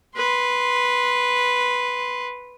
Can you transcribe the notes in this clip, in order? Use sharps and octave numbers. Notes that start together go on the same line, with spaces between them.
B4 C6